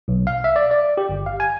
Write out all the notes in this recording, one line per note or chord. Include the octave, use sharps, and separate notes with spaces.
B1
F5
E5
D5
D5
G4
G1
F5
G#5